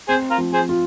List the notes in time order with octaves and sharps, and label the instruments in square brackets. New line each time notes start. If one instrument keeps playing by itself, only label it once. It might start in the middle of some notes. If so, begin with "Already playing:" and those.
[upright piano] C4 [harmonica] G#4 C5
[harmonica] F4 A#4
[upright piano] F3
[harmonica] G#4 C5
[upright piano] F4